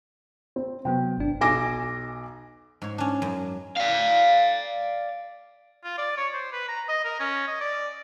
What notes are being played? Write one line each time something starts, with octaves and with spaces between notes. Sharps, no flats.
C4
C3 F#3 B3 G5
G1 D4
B1 G#5 D6 A#6
G#2 C#5
C#4 D4
F#2
D5 F5
F4
D5
C#5
C5
B4
A#5
D#5
A#4
C#4
D#5
D5